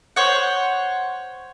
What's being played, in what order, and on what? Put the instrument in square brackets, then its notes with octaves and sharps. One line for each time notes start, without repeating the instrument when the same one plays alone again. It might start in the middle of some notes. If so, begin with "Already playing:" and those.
[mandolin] C5 C#5 F#5